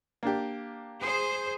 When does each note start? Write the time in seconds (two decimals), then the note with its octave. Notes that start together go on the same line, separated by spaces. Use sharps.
0.23 A#3 D4 G4
1.01 G#4 C5